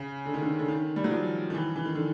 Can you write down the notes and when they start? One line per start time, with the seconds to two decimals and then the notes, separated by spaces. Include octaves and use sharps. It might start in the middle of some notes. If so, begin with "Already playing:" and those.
Already playing: C#3
0.26 D3
0.34 D#3
0.42 D3
0.59 D3
0.68 D#3
0.96 G3
1.04 F#3
1.11 F3
1.50 D#3
1.55 E3
1.76 E3
1.86 D#3
1.95 D3